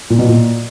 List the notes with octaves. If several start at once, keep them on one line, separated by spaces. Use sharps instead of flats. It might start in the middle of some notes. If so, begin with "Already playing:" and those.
A#2
B2
A#2